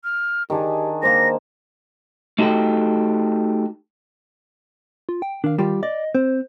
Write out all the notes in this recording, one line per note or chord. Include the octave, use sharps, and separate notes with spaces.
F6
D#3 D4 G4 G#4
A#3 C5 A#6
A3 D#4 F#4 G4 A4 G5
F4
G5
D#3 D4 F5
G3 F4 G4
D5 D#5
C4 C5